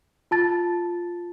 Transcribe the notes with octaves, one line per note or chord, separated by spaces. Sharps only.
F4 A5 A6